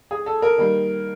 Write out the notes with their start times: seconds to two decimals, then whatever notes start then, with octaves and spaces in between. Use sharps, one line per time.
0.11 G#4
0.26 A4
0.42 A#4
0.58 D#3 G3 A#3